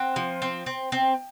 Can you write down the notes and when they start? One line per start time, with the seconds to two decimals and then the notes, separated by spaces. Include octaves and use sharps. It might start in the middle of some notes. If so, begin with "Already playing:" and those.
Already playing: C4 F#5
0.16 F3
0.42 C4
0.66 C4
0.92 C4